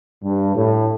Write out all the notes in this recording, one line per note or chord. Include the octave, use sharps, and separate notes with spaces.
G2
A2